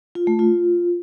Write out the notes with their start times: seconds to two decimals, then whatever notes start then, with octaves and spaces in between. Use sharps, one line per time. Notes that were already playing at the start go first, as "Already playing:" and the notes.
0.15 F4
0.27 A3
0.39 F4